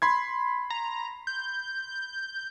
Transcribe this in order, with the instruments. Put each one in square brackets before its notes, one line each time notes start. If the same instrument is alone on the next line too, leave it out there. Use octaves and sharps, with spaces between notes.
[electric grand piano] B5 C6 G#6
[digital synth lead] A#5
G6